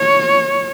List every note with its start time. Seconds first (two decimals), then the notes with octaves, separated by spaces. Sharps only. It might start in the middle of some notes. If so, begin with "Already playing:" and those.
Already playing: C#5